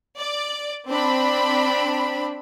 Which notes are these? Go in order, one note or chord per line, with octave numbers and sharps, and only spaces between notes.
D5
C4 D4 B5